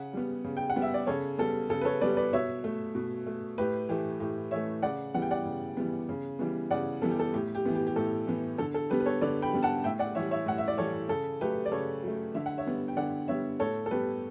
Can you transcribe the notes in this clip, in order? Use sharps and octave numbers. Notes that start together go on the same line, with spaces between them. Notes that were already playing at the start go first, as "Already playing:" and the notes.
Already playing: C#3 F#5
G3 B3
C#3
G5
F#5
G3 B3
E5
D5
C#3 A4 C#5
G3 B3 A4
C#3 A4
B4
A4 C#5
G3 B3 B4 D5
B4 D5
B2 C#5 E5
A3
B2
A3
A2 G4 B4
E3 A3 G4
A2 G4
E3 A3 C#5 E5
C#3 D5 F#5
E3 G3 B3 F#5
G5
D5 F#5
C#3
E3 G3 B3
C#3
E3 G3 B3
C#3 D5 F#5
E3 G3 B3 A4
G4
A4
A2 G4
G4
E3 B3
G4
G4
A2 A4
E3 B3
D3 A4
A4
G3 B3 G4 B4
B4
A4 C#5
D3 B4 D5
G5 B5
G3 B3
F#5 A5
A2 E5 G5
D5 F#5
E3 G3 C#5 E5
C#5 E5
A2 F#5
E5
D5
E3 G3 A4 C#5
C#3 A4
F#3 A3 G4 B4
D5
C#3 A4 C#5
F#3 A3
D3 E5
F#5
C#5 E5
G3 B3
G5
D3 D5 F#5
G3 B3 C#5 E5
A2 A4 C#5
A4
G3 B3 G4 B4